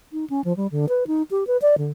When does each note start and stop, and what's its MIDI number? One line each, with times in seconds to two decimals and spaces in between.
0.13 0.25 63
0.30 0.41 61
0.44 0.55 53
0.57 0.67 55
0.72 0.86 50
0.89 1.07 71
1.07 1.23 63
1.31 1.44 67
1.47 1.57 71
1.62 1.75 74
1.78 1.91 50